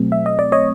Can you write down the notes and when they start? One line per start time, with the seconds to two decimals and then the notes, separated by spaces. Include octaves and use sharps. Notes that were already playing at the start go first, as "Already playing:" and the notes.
Already playing: B2 F#3 A3 C4
0.12 E5
0.26 D#5
0.39 D5
0.52 C#5 D#5